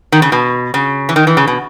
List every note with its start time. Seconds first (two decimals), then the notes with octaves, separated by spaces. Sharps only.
0.12 D#3
0.22 C#3
0.32 B2
0.74 C#3
1.09 E3
1.16 D#3
1.27 E3
1.37 C#3
1.47 B2